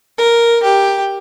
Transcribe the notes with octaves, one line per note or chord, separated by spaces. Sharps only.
A#4
G4